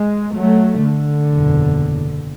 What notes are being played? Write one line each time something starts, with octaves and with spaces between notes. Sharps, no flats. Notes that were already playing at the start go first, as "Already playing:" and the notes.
Already playing: G#3
F#3 A3
D3
F#1 E2 B2